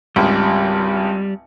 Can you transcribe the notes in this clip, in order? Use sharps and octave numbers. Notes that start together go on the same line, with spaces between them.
G#1 C#2 G3